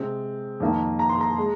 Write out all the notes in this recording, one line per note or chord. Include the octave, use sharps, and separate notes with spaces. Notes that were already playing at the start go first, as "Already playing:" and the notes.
Already playing: C3 G#3 C4
F2 D#3 A#3
A#5
C6
A#5
G#3